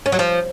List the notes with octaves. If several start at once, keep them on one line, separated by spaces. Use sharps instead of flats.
C#4
F#3
F3